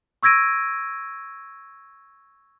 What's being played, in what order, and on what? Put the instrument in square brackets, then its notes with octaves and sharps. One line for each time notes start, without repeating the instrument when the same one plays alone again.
[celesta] C#6 E6 G#6 A#6 D7 D#7